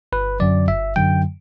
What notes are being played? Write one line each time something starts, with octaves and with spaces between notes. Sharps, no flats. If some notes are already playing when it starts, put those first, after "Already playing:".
G1 B4
F#2 D3 F#3 D5
G1 E5
F#2 D3 F#3 G5